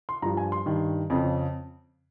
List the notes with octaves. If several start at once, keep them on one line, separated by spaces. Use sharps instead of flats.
C6
G2 F3 A#5
G#5
C6
G2 D#3
F2 C#3 F3